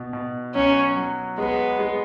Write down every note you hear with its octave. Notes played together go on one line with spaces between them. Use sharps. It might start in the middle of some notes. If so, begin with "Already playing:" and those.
Already playing: B2
B2
F#3 C#4
F#3
G#3 B3
G#3